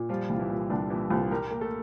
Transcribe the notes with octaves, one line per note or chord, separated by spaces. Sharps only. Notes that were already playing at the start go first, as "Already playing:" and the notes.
Already playing: A#2
F3 G3 F4
C2 F4
E3 E4
A#2
C2 D3 D4
A#2 E3 E4
C2 F3 F4
G3 G4 A#4
A#3
A3 A4